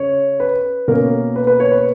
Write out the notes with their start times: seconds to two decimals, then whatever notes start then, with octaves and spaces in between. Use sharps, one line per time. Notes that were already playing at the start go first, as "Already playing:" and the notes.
Already playing: C#3 C#5
0.40 B4
0.88 B2 A#3 C#4 A#4
1.36 B4
1.47 B4
1.60 C#5
1.71 B4